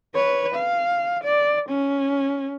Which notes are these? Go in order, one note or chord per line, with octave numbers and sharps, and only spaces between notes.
B4 C#5
F5
D5
C#4